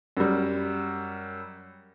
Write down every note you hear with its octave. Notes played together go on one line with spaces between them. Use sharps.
F#2 G3